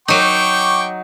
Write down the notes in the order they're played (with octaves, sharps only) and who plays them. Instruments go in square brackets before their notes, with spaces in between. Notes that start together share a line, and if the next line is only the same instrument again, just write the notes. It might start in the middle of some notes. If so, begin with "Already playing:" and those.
[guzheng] F#3 D#4 [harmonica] G5 C#6 D6